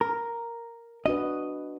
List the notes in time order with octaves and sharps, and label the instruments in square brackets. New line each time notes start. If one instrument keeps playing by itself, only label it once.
[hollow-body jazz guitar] A#4
[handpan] D4 F#4 B4 [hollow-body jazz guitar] D#5